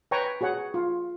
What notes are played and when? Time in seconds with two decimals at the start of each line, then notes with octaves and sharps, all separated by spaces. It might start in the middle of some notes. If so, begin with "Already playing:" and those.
0.11 B4 C#5 G5 G#5 A#5 C#6
0.41 F#4 G#4 C#5 F#5
0.74 F4